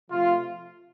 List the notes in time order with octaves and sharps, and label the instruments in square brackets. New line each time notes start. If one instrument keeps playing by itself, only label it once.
[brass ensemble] C3 F3 A3 F4